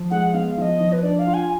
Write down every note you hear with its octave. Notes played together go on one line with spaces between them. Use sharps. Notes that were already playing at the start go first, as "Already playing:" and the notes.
Already playing: F3
G#3 F#5
B3 F5
F3 D#5 F5
F3
B4
D4 D5
F5
F4
G#5